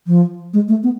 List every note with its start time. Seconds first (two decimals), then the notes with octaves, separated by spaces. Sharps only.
0.07 F3
0.53 G#3
0.68 A3
0.83 B3